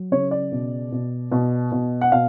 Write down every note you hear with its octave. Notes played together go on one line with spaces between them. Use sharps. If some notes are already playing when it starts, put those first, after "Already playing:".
Already playing: F#3
C#3 C#5
D5
B2
B2
B2
B2
F#5
B2 F5